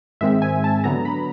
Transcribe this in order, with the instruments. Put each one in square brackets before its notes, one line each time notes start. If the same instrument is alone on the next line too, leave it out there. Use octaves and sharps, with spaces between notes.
[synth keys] G#2 D#3 G#3 C4 E5
G#5
A5
D3 F#3 B3 A#5
B5